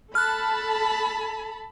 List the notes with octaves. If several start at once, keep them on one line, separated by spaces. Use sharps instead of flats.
A4 A5 B5 F6 F#6